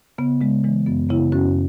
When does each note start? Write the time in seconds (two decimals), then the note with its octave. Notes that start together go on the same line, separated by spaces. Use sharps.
0.18 C#3 B3
0.41 C#3 G#3
0.64 E3 G#3
0.87 F#2 B3
1.09 C#3 B3 E4
1.32 F#2 C#4 F#4